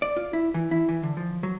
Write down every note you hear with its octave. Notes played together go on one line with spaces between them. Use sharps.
D5
F4
E4
E3
E4
E3
D3
F3
F#3